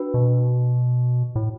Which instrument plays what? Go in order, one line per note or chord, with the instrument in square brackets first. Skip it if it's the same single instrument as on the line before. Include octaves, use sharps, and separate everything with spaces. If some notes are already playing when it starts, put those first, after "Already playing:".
Already playing: [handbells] D4 F#4 B4
[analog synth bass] B2
A2